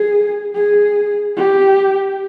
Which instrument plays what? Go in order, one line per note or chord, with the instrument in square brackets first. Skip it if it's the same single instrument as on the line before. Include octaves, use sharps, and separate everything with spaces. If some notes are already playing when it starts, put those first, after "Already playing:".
Already playing: [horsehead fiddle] G#4
G#4
G4